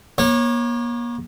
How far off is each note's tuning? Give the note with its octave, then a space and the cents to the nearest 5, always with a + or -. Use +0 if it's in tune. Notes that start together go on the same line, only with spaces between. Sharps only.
A#3 +40 C#5 -20